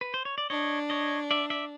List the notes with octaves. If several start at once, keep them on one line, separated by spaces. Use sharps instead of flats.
B4
C5
C#5
D5
D4 C#5 D#5
C#5 D#5
D5 E5
D5 E5